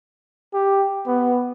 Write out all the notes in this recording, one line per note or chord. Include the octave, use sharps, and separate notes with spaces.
G4
B3